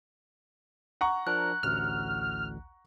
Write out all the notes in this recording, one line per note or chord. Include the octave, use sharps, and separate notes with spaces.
F#5 A#5 C#6
F3 D4 A#4 F#6
A1 D2 F6